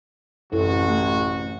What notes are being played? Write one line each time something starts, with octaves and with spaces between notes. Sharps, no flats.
A1 F#2 C3 E4 F#4 A4
A3